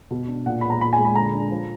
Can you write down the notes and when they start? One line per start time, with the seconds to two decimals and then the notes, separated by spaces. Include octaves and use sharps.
0.11 B2
0.28 D4
0.46 A#2 F#5
0.61 B3 B5
0.70 A#5
0.81 A#2 B5
0.93 G#5
0.99 G#3
1.05 B5
1.15 D3 A#5
1.34 D4
1.51 F3